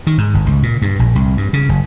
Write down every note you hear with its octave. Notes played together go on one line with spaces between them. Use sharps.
D#3
G#2
G1
C#2
A#2
G2
A#1
C2
G2
C#3
F#1